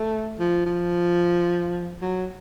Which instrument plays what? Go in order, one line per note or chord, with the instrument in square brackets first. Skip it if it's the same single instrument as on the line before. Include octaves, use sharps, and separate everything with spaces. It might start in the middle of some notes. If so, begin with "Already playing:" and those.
Already playing: [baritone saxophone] A3
F3
F3
F#3